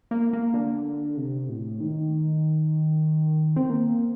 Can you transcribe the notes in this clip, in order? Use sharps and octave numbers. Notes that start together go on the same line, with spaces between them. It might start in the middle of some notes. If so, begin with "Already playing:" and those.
A#3
A#3
D3
C3
A2
D#3
C4
A#3